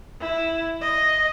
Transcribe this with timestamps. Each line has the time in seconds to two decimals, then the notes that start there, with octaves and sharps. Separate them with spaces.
0.21 E4
0.81 D#5